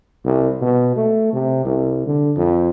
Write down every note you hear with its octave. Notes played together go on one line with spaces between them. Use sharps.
C2
B2
A3
C3
C2
D3
F2